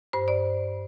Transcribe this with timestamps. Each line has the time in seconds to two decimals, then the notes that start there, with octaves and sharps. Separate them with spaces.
0.13 G2 C5
0.28 D5